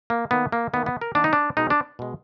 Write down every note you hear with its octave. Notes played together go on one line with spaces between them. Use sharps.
A#3
D#3 A#3 B3
A#3
D#3 A#3 B3
B3
A#4
D#3 A#3 D4
D#4
D4
B2 G#3 D#4
D4
B2 G#3